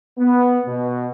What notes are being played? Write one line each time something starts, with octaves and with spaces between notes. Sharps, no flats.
B3
B2